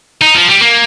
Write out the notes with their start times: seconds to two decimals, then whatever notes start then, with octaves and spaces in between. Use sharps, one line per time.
0.21 D#4
0.35 F3
0.48 G3
0.62 A#3